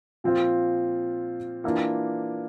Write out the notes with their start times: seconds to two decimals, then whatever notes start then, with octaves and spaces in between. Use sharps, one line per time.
0.24 A#2 F3 C4 F4
1.64 E3 A#3 D4 F4